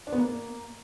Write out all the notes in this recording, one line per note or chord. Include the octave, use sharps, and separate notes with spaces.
D4
B3
A#3